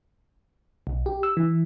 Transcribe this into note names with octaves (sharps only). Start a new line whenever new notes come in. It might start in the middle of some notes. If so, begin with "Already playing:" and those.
B1
G4
E6
E3